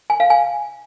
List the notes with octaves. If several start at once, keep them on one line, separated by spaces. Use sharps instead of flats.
G#5
F5
G#5